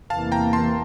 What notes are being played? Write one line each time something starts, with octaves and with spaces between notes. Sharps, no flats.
E2 C3 E3 A#3 F5 A5
G5 A#5
A5 C6